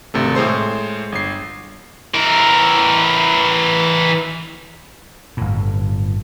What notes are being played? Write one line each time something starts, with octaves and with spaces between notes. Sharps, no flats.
G#1 C3 A3
A2 G#3 C5 C6
G1 C7
E3 A#4
G1 A2